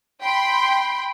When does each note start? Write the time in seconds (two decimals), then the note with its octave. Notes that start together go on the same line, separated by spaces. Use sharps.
0.23 G5 B5 C6